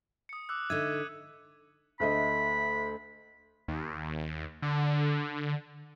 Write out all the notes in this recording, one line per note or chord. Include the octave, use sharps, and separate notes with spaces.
D#6 C#7
D6 E6 F#6
D3 D#4 E5 E6 G#6 D#7
D2 A3 D#5 B5
D#2
D3